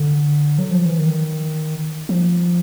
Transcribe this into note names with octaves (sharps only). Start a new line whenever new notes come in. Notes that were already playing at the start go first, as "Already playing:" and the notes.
Already playing: D3
F#3
F3
E3
D#3
F3